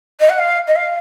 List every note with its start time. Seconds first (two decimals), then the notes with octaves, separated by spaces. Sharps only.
0.20 D#5
0.29 F#5
0.39 F5
0.67 D#5
0.76 F5